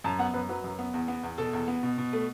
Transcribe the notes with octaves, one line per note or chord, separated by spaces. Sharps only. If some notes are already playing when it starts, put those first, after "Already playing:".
F#2 A5
B3 F#5
F#2 B4
F#3 B4
F#2
B3
E2
B3
E2
B2 A4
E2
B3
B2
B2
A3